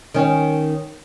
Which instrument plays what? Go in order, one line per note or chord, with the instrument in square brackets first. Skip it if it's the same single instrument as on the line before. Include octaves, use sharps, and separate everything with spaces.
[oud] D#3 C#4